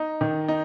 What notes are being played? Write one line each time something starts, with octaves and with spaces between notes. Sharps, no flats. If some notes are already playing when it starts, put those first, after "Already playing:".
Already playing: D#4
D#3
D#4